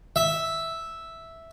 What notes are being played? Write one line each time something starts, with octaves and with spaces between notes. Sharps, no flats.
E5